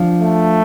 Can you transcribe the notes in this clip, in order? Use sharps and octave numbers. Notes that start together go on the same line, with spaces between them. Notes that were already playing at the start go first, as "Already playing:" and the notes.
Already playing: F3 D4
A3